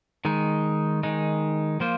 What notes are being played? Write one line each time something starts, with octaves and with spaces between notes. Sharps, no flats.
D#3 G#3 D#4
D#3 G#3 D#4
F3 A#3 F4 C5